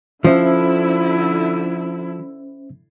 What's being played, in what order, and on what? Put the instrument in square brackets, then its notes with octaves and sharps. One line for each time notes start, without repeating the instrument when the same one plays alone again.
[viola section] D3 E4 [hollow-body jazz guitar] F3 [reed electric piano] C#4 C5 E5